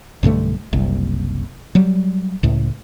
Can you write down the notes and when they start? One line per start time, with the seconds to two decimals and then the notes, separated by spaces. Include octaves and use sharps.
0.23 B1 G2 D3 A3
0.73 F#1 C2
1.75 F#3 G3
2.43 C#2 A2